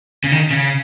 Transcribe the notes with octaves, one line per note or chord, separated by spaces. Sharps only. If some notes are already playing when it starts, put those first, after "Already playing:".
C#3
D#3
C#3